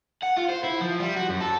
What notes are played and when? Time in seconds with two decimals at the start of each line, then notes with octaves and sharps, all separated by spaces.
0.22 F#5
0.37 F4
0.49 C5
0.64 E4
0.80 F3
1.00 G3
1.16 F#4
1.29 F#2
1.41 A4